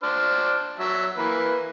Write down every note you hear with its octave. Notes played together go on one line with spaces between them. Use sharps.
D4 C5 F6
F#3 E5
E3 A#3 B4